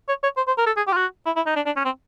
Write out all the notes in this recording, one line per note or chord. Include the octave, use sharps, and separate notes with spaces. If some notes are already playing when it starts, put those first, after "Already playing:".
C#5
C#5
C5
C5
A#4
A4
G#4
G4
F4
F#4
E4
E4
D#4
D4
D4
C#4
C4